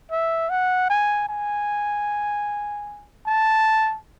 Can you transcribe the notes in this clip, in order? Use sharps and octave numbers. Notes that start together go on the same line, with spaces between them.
E5
F#5
G#5
G#5
A5